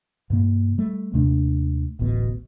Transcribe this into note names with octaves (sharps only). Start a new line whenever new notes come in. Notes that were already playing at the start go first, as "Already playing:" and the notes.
G2 B2 A#3
G3 A3
D#2 C3 A3 D4
D1 A1 D2 B2